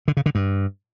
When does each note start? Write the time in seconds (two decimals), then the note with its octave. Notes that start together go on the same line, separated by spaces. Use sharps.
0.08 D3
0.17 C#3
0.26 D3
0.35 G2